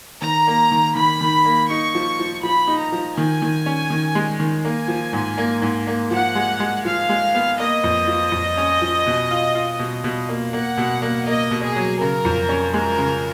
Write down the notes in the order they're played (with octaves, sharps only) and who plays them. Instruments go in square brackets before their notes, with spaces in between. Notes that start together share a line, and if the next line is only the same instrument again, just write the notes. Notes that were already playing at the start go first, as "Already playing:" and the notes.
[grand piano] D#3 [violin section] A#5
[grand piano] A#3
D#3
[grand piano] D#3 [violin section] B5
[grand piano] D#3
A#3
[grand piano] D#4 [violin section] C#6
[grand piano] F3
F3
[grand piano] F3 [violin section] B5
[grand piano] D#4
[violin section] A#5
[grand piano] F3
[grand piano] D#3 [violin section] G#5
[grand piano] D#3
C#4
D#3
G#3
D#3
[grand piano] A#3 [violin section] G#5
[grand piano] F3
G#2
A#3
G#2
A#3
[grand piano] F3 [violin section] F#5
[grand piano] G#3
G#3
[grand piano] F3 [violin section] F5
[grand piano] G#3
B3
[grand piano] A#3 [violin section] D#5
[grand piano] F2
F3
F2
C#4
F3
B2
F4
F4
B2
B2
A#3
[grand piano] A#3 [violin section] F#5
[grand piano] B2
A#3
[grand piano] A#3 [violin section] D#5
[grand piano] B2
[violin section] G#4
[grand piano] F#3
[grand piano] C#3 [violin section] A#4
[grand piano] F2
C#4
[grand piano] G#3 [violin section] A#4
[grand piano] C#3